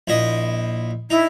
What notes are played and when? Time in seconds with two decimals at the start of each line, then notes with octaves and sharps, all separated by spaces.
0.08 A#1 E4 D#5
1.10 D#4 E4